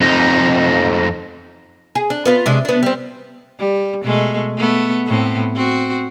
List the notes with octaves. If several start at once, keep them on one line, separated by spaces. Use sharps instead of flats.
F2 D#4
G#4
D4
B3 F4 B4
C3 G#3 D4
B3 D4
G3 C4
G3
B2 G#3 A3
A3 B3
A2 B3 C4
C4 F#4